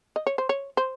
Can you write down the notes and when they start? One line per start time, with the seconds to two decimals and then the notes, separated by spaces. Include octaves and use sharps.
0.16 D#5
0.27 C#5
0.38 C5
0.49 C#5
0.77 C5